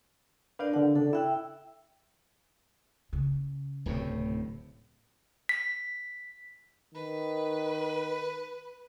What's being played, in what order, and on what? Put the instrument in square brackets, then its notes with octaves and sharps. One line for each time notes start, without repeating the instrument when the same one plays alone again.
[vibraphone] D4 A#4 D5 [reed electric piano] B4 F5 G6
[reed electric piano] D3 D4 [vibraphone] F#5
[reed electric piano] C#3 D4 [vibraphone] A4
[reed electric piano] E4 F#6 [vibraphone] E5 G5 E6
[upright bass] C#3
[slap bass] D1 A2 C3
[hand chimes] B6
[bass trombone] D#3 [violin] B4